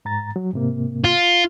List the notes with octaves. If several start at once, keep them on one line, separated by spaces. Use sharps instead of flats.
G#2 A#5 A6
F#3
G#2 C3 A#3
F4